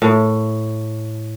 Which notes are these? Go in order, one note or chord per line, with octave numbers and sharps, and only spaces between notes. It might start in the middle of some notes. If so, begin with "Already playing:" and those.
A2